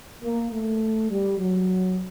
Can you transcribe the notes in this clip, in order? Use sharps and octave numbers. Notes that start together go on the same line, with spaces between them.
A#3
A3
G3
F#3